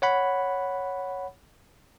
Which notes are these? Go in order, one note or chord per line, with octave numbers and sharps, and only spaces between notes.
C#5 F#5 B5